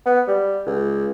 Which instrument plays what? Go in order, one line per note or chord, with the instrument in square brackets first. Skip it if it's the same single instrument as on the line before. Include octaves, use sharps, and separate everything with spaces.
[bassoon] B3
G3
C#2